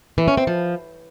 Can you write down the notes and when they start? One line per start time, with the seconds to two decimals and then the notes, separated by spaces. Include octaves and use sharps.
0.18 E3
0.28 C#4
0.37 C4
0.47 F3